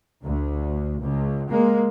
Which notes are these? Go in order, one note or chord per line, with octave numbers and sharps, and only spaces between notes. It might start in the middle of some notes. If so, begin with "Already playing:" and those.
D2
C#2
G#3 A#3